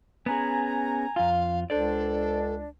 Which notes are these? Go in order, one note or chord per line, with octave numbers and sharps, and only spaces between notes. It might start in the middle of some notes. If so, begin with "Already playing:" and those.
B3 C#4 G#4 G#5 A#5
F2 F4 F5
C#2 D4 A4 C5 D5